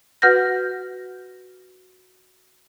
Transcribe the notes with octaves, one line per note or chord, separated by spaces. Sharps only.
F#4 B4 F#5 F6 G6 A#6